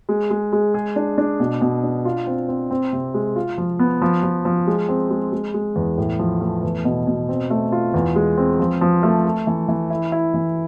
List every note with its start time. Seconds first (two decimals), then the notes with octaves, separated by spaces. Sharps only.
0.09 G#3
0.30 G#3
0.53 G#3
0.74 G#4
0.96 D4
1.18 D4
1.40 B2
1.61 B2
1.83 D4
2.05 F4
2.27 C4
2.48 C4
2.71 C4
2.93 C3
3.14 G#3
3.36 F4
3.58 F3
3.79 B3
4.02 F3
4.23 F3
4.45 F3
4.67 G#3
4.89 C4
5.11 G#3
5.32 G#3
5.54 G#3
5.76 E2
5.98 A2
6.19 F3
6.41 A3
6.63 E2
6.85 B2
7.07 B2
7.29 C4
7.50 A3
7.72 F4
7.94 E2
8.16 G#3
8.38 C4
8.60 F3
8.81 F3
9.03 A3
9.25 A4
9.47 E3
9.68 E3
9.90 E4
10.12 E4
10.34 E3